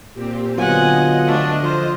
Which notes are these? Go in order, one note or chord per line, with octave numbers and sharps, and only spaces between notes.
A#2 C4 G4
D3 F#3 B3 F4 D#5 F#5 G#5
A3 D4
F3 F4 C5